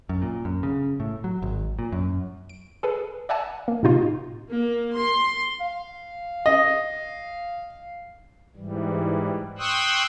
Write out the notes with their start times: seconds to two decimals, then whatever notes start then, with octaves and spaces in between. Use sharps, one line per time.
0.09 F#2
0.22 A#2
0.45 F#2
0.63 C#3
1.00 A2
1.24 F#3
1.42 G#1
1.79 A#2
1.92 F#2
2.49 D7
2.83 G#4 A4 B4
3.29 D5 E5 F#5 G#5 A5
3.68 A#3
3.83 A2 C3 D#4 F4
4.49 A#3
4.95 C6
5.61 F5
6.46 D#5
8.56 G#2 E3 G3
9.58 G5 C6 C#6 D#6 E6 F#6